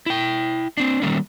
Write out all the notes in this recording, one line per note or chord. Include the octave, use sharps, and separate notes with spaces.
E4 G5
C4 D4
D#3 F#3 G3 A3 A#3 C#4